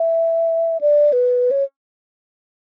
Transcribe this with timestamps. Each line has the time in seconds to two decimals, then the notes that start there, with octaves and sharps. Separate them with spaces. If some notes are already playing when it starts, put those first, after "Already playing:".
Already playing: E5
0.81 D5
1.13 B4
1.51 C#5